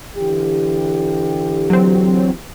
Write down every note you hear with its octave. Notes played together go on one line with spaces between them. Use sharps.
D3 E3 G4
F#3 C4